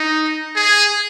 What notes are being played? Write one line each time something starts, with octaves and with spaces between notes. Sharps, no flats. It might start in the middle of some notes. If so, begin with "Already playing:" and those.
Already playing: D#4
G#4